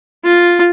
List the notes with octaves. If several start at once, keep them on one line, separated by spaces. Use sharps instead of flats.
F4